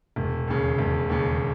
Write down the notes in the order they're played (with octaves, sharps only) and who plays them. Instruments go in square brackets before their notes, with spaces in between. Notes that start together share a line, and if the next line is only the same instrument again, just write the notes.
[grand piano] E1
D#2 C#3
E1
D#2 C#3